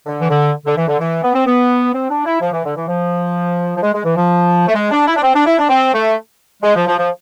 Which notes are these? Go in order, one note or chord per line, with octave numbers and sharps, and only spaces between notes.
D3
E3
D3
D3
E3
D3
E3
B3
C4
B3
C4
D4
E4
F3
E3
D3
E3
F3
F3
G#3
G#3
E3
F3
A3
G#3
D4
E4
D4
C4
D4
E4
D4
C4
A3
G#3
F3
F3
F3